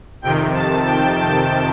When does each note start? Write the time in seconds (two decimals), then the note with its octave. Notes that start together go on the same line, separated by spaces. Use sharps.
0.22 F2 C3 D#3 G5
0.54 A5
0.86 G5
1.19 A5